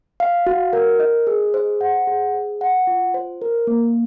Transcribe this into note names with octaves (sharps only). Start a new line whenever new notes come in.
F5
F#4
A#4
D#5
G#4
C5
F#5
G#4
C5
F#5
F4
C5
A#4
A#3